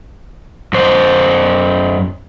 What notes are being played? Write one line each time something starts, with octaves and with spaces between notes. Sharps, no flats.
F#2 C5